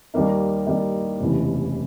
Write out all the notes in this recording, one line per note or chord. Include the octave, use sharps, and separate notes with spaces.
D#2 D#3 G3 A#3 D#4
D#2 D#3 G3 A#3 D#4
F1 D#2 C#3 E3